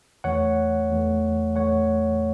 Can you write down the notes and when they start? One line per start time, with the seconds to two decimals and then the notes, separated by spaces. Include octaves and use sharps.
0.24 E2 E3 A3 C#5 F#5
0.90 E2 E3 A3
1.56 E2 E3 A3 C#5 F#5